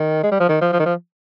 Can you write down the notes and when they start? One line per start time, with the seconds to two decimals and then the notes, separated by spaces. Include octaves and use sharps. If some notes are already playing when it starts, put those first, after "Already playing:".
Already playing: D#3
0.23 G#3
0.32 G3
0.40 F3
0.49 D#3
0.61 F3
0.73 F3
0.80 D#3
0.86 F3